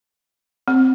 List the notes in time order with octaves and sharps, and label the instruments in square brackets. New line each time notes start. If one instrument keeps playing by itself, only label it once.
[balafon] C4